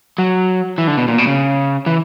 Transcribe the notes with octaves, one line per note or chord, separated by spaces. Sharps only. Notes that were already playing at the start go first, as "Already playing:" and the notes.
F#3
E3
D3
B2
A#2
B2
C#3
E3